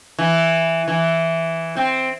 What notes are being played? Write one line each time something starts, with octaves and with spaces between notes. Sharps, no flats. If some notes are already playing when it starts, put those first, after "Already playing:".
E3
E3
C4